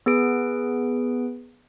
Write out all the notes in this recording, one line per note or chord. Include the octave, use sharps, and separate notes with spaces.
B3 G#4 B4 D7